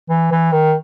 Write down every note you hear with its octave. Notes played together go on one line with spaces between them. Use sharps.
E3
E3
D#3